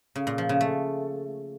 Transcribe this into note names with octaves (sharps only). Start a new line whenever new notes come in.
C#3
A#2
F3
C#3
A3